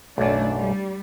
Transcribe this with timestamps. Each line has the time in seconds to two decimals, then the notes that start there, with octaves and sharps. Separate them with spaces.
0.18 B1 F#2 A2 A3 D4
0.57 G3